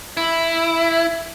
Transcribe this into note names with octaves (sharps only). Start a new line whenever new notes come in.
E4